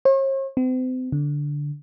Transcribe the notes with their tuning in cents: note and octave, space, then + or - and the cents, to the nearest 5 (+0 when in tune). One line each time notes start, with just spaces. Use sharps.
C#5 -45
C4 -40
D3 -10